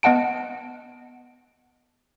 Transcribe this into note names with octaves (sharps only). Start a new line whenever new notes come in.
B3 D#5 F#5 A5 D7